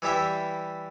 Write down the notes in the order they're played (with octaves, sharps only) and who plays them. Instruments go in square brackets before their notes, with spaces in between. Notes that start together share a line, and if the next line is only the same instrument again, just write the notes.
[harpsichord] E3 G3 E4 G4 E5